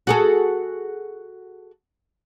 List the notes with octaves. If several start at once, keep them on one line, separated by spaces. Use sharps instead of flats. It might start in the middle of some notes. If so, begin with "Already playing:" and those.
F#4 G#4 A4